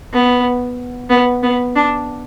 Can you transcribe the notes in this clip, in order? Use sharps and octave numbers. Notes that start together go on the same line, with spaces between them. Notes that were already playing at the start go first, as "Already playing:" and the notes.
B3
B3
B3
D4